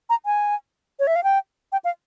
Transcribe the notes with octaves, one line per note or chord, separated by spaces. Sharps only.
A#5
G#5
C#5
E5
F5
G5
G5
F5